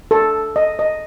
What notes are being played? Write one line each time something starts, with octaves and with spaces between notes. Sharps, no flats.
A4
D#5
D#5